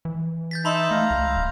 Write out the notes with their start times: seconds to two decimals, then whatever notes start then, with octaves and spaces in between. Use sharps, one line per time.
0.05 E3
0.51 G6 A6 B6
0.65 D#4 E5 A5 B5 C6
0.91 A3 F5 A#5
1.11 C#2
1.36 D1